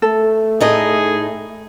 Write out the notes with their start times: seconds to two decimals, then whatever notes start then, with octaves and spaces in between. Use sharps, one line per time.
0.02 A3 A4
0.60 A2 D#4 G#4 D#5